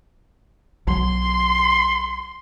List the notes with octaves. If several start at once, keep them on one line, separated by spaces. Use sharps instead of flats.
B1 F#3 C6